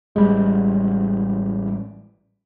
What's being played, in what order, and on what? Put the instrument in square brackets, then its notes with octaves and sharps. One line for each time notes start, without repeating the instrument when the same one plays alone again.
[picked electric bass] A1 G3 [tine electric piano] G#3